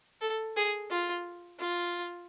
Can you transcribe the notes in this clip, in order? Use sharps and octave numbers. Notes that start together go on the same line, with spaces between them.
A4
G#4
F4
F4